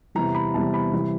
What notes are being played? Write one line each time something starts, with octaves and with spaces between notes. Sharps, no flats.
E2 C3 E3 G3 A#5
B5
E2 C3 E3 G3 A5
B5
C3 E3 G3